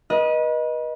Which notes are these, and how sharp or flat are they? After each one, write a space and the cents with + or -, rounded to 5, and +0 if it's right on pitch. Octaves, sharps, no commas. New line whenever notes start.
B4 -35 D#5 +0